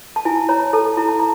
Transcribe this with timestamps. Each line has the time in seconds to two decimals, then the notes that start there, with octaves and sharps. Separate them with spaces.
0.16 A5
0.25 E4 G#5
0.49 C#5 A#5
0.73 A4 A5
0.97 E4 A#5
1.09 A5
1.19 A#5